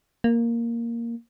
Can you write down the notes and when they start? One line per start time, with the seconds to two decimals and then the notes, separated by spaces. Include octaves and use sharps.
0.24 A#3